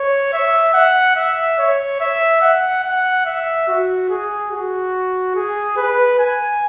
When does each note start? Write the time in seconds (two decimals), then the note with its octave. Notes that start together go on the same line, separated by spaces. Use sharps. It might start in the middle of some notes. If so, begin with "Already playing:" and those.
Already playing: C#5
0.33 E5
0.74 F#5
1.16 E5
1.59 C#5
2.00 E5
2.41 F#5
2.84 F#5
3.25 E5
3.68 F#4
4.09 G#4
4.51 F#4
5.35 G#4
5.77 B4
6.18 G#5